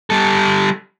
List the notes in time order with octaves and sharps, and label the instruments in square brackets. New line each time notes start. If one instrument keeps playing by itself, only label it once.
[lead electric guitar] G3 A4